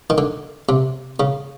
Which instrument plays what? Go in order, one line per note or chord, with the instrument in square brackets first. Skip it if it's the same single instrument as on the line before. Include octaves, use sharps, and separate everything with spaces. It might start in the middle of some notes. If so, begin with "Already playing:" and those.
[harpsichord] D#3
D3
C3
C#3